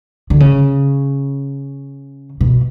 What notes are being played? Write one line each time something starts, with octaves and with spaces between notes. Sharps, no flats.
D3
C#3
B2